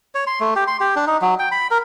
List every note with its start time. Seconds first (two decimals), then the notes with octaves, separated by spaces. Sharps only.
0.15 C#5
0.27 C6
0.40 A3
0.56 G4
0.67 C6
0.80 G4
0.96 D4
1.07 D#4
1.22 F#3
1.39 G5
1.51 B5
1.71 A#4